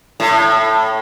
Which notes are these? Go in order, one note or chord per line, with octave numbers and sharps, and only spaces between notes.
A2